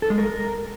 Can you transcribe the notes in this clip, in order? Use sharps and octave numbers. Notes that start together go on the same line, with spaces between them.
A4
G#3
A#4